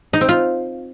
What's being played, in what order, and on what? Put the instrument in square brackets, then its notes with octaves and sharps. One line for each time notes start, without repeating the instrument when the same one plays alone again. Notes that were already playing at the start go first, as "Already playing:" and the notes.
[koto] D#4
C4
F4